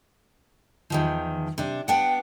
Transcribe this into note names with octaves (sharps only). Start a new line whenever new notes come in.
E2 D#3 F3
C3 D4
B3 D4 F#5 G5